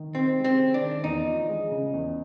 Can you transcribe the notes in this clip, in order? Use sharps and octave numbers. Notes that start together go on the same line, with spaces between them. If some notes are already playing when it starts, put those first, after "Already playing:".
Already playing: D#3
C3 C4
G#3
C4
C#4
D4
D#3
E2 D#4
F3
G#3
C#3
E2